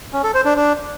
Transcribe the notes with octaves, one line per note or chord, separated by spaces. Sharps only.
C#4
A4
C5
D4
D4